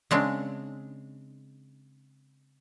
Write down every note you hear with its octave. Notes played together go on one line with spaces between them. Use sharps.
C#3 G#3 C4 D4